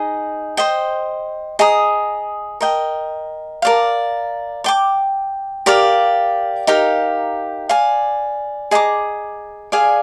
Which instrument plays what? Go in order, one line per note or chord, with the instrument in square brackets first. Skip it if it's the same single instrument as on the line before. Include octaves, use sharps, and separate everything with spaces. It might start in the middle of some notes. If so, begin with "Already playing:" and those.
Already playing: [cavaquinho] D#4 G#4 D#5
C5 D#5 G5
G#4 D#5 A#5 D#6
A#4 D#5 G5
A#4 D5 F5
D5 G5 D6
G4 A#4 D5 F5
D#4 G4 A#4 F5
D5 F5 G#5
G#4 D#5 A#5 D6
G#4 D5 F5 G#5